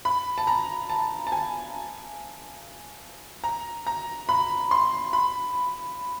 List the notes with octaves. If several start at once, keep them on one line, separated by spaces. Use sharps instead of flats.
B5
A5
A#5
A5
A5
G#5
A#5
A#5
B5
C6
B5